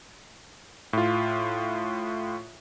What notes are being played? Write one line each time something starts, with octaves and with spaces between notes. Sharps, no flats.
A2 F4